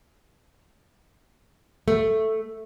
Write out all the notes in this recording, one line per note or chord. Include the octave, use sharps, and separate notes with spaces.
A3